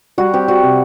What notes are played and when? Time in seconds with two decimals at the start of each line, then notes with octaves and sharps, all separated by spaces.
0.18 G3 F#4
0.34 C4 G4
0.48 G3 F#4
0.63 C3